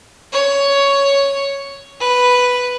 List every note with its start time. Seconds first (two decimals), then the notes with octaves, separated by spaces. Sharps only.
0.33 C#5
2.00 B4